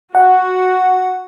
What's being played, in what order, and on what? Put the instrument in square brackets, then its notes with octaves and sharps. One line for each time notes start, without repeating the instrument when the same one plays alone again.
[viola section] F#4 [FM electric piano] F#5